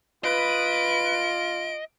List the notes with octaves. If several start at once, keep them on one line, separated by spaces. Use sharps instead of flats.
F4 B4 D#5 D7